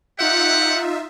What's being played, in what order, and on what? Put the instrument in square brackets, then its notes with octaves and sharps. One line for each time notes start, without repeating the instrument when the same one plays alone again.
[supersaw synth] D#4 F4 E5 [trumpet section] G4 F#5